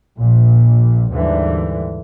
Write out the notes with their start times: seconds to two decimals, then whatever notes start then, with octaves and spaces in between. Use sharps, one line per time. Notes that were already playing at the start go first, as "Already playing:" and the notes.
0.19 A#1 A#2
1.13 D#2 G#2 D3 E3 G3